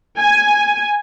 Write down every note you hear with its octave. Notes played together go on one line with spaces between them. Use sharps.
G#5